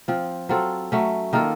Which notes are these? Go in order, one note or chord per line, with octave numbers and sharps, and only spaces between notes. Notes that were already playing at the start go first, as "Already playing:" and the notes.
F3 C4 F4
F#3 C4 F4 A4
F#3 A3 C#4
D#3 A#3 F4 A4